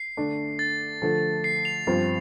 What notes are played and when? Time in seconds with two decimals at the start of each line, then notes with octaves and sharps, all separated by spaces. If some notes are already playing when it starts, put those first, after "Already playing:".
Already playing: C7
0.17 D3 A3 D4
0.59 A6
1.02 D3 F3 A3
1.44 C7
1.65 F7
1.87 G2 F3 C4 F4